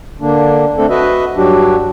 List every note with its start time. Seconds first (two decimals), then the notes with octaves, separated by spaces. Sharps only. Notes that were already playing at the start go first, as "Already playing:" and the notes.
0.21 D3 A#3 D4
0.77 A3 C4 D4 A4
0.89 F#4 B4 D#5 E5
1.36 G2 F#3 D4 F#4 G4